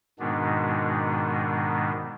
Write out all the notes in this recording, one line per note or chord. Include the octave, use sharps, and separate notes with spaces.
G#2 B2 D#3 G#3 B3 D4